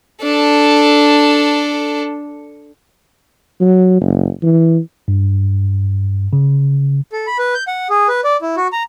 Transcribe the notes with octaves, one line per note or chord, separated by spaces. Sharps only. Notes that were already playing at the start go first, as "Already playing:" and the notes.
D4 A4
F#3
F#1
E3
G2
C#3
A4
B5
B4
G6
F#5
G#4
B4
D5
E4
F#4
A#5